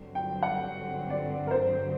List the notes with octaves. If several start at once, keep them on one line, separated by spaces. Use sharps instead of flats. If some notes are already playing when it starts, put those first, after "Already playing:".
Already playing: G2 D3 F#3 C4
G5
F#5
D5
A#4
C5